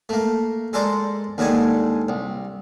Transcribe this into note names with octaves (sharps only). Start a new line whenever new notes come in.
A3 A#3
G#3 A4 A#4 C5 D5
D#2 D3 G3 G#3 D4 G#5
C2